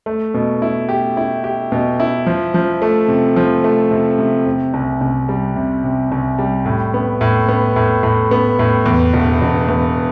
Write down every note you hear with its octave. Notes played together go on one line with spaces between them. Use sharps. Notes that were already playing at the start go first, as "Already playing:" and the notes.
A3
B2
E4
G4
E4
G4
B2
E4
F3
F3
A3
C3
F3
A3
C3
C3
C3
C2
C2
G3
C3
C3
C2
G3
A2
B3
A2
B3
A2
A2
B3
A2
E2
E1
E1
E2